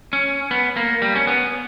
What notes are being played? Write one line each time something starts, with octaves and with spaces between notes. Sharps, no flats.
C#4
B3
A#3
G3
C#4
B3